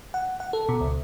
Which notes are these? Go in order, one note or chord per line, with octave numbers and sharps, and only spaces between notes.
F#5
F#5
A4
B2
C#2